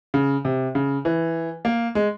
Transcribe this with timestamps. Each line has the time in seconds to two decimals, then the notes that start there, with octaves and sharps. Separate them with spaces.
0.14 C#3
0.45 C3
0.75 C#3
1.05 E3
1.65 A#3
1.95 G#3